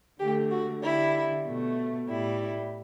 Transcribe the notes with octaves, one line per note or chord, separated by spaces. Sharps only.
D3 A3 G4
F#4
D3 G3 E4
B2 A3
A2 G3 E4